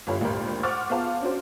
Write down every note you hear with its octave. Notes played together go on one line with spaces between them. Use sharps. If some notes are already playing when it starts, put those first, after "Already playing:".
G1 F4 G4 A4 C#5 B5
G#1 D2 A#2 G4 A#4 B5
C5 F#5 C#6 D6 F6 A6
B3 F4 G#4 C5 F5 A5
C#4 D4 F#4 C5